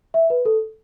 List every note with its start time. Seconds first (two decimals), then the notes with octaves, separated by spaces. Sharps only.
0.14 E5
0.30 B4
0.45 A4